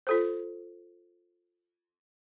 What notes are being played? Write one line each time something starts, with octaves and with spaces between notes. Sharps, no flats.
F4 A4 C5